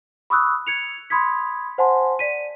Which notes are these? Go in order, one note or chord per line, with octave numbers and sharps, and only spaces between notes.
B5 C#6 D#6 E6 F#6
G#6 C#7 F7
B5 C6 D#6 G#6 B6
C5 F#5 G#5 A5 C6
D5 B6 D#7